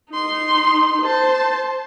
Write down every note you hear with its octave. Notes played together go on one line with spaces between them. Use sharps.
D#4 C6
C5 A5